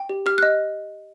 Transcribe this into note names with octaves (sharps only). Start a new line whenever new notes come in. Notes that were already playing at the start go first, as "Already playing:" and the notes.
Already playing: G5
G4
G4 F6
F#6
D#5